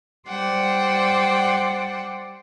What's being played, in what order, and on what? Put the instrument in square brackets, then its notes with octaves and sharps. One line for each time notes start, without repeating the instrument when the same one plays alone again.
[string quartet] G3 C5 D5 F#5 G5